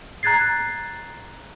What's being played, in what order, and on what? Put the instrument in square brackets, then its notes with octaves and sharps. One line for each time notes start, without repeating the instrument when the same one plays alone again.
[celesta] A#5 F#6 G#6 A6 C7